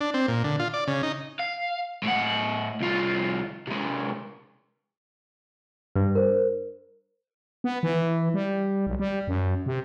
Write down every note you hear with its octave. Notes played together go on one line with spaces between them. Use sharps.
D4
C4
A#2
D3
F4
D5
C#3
D#4
F5
A2 F#5
C2 F4
C3 G#3
G2
A#4 C5
B3
E3
G3
B1
G3
F#2
C3